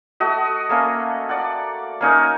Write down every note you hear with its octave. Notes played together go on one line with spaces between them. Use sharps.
A3 F#4 D#5
A3 A#3 C#4
D5 F#5
A#3 C#4 D#4 A#4